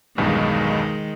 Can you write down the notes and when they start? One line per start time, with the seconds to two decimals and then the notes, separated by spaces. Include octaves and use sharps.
0.18 B1 E2 G2 D#3 G#3